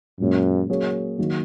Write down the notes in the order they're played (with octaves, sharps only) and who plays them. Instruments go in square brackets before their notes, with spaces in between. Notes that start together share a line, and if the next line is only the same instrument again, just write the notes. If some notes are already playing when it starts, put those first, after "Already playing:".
[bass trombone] F#2 [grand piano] A#2 G#3 C#4
[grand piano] F#3 A#3 C#4 G#4 C#5
D#3 F#3 A#3